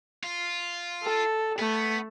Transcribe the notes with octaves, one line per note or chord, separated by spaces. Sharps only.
F4
A4
A3 B3